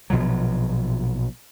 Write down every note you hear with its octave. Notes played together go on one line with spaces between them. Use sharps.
A#1 B2 F3 F#3